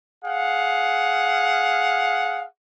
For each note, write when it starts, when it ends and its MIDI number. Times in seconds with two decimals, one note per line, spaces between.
0.25 2.46 68
0.25 2.46 77
0.25 2.46 78